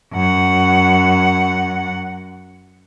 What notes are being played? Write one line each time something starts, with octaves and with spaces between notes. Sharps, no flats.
F#2 F#5